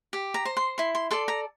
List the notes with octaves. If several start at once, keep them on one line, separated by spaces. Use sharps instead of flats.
G4
A#5
C5
C6
E4 C6
C6
A4 D5 C6
A#5